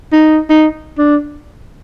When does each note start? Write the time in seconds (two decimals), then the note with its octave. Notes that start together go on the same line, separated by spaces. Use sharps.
0.12 D#4
0.50 D#4
0.98 D4